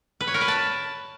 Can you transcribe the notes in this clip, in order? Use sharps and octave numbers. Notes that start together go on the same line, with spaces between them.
B4
C#5
A#4
B4
A5